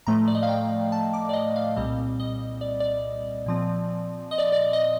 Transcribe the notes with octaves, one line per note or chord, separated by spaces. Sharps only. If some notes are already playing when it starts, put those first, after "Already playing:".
A2 F3 A3 A#5
D5
D#5
F5
G5
A5
D6
D5
D#5
F5
C2 A#2 G3 C4 D#5
D#5
D5
D5
A#2 F3 C4
D#5
D5
D5
D#5